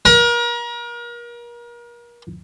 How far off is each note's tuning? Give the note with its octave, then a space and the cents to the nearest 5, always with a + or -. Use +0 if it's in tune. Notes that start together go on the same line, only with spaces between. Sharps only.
A#4 +35